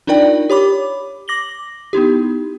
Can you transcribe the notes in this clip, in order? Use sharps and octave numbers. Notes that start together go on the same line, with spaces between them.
D4 D#4 F4 A#4 D5 G5
G4 C#5 B5 D6
D6 A#6 F#7 G7
B3 D#4 E4 G4